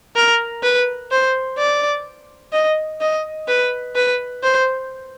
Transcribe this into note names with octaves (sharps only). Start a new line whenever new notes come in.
A#4
B4
C5
D5
D#5
D#5
B4
B4
C5